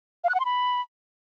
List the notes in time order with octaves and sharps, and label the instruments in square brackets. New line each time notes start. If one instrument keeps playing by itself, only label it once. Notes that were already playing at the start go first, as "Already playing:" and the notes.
[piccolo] F5
F#6
F#5
C6
B5